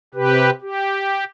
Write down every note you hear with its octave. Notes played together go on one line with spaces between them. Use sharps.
C3 G4 B4
G4